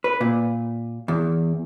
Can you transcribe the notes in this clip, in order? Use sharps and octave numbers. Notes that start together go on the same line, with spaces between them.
B4
A#2
E2